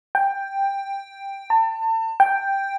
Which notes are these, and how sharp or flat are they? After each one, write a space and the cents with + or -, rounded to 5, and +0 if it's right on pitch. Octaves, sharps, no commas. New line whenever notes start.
G5 +10
A5 +35
G5 +5